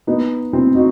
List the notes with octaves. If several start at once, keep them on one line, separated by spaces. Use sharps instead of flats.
B3 D#4
C4 E4
D#4 F#4